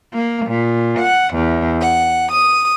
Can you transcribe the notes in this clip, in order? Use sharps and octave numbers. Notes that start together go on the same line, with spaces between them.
A#3
A#2
F#5
E2
F#5
D#6